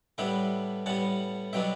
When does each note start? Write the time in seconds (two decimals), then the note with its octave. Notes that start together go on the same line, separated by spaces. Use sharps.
0.18 A2 G3 B3 D4 E5 G5
0.86 A2 G3 B3 F#5 A5
1.53 B2 F#3 B3 D4 E5 G5